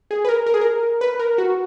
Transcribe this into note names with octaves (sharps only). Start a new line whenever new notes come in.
G#4
B4
A#4
A#4
G#4
A#4
B4
A#4
F#4